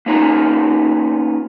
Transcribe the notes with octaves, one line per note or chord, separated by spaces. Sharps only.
A#3 B3 C#4 D#4 F4 A#4